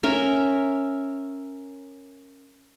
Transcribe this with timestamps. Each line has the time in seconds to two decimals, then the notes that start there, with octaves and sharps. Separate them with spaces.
0.03 C#4 A#4 E5